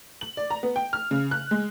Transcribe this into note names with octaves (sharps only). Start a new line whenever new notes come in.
F#7
D5
A#5
B3
G5
F6
C#3
F#6
G#3